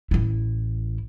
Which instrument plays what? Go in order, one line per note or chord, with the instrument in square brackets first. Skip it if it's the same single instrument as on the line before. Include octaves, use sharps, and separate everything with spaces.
[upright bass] A1 E4